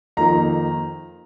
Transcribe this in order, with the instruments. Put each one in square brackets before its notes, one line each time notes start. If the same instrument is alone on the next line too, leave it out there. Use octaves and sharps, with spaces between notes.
[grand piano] F2 D#3 A#3 F4 A#5